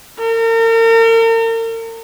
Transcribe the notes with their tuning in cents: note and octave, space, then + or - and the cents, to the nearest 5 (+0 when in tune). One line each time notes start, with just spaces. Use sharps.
A#4 -40